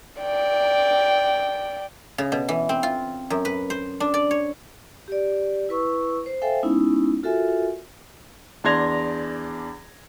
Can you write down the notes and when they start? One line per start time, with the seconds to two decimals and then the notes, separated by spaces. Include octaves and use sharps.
0.21 D5 G5
2.18 C#3
2.32 B2
2.49 E3
2.69 C4
2.83 F4
3.30 F#2
3.45 B4
3.70 C5
4.00 D4
4.14 D5
4.31 C#5
5.08 G4 D5
5.69 E4 B4 C#6 E6
6.26 C5
6.42 A4 C5 E5 F5 G5 G#5
6.63 G#3 B3 C#4 D#4 E4
7.23 F4 F#4 A4 A#4 E5 G#5
8.64 E2 D4 C6 G#6 A#6 F7